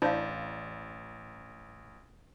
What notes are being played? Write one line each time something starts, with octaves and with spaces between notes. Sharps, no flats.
A1 D4 E4 C5 D5 F5